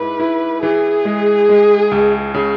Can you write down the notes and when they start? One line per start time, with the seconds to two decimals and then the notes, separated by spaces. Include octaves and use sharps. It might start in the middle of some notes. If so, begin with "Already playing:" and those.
Already playing: G#2 E4 B4
0.20 E4
0.62 E3 G#4
1.05 G#3
1.49 G#3
1.91 C#2
2.34 C#3